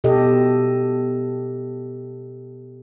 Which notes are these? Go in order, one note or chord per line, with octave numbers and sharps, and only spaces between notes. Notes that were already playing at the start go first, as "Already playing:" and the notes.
B2 G4 A4 D#5